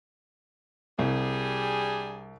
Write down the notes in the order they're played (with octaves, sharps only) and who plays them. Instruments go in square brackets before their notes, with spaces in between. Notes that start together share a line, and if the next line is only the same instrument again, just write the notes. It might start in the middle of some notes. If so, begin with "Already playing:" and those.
[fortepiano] C2 [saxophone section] G3 D4 G#4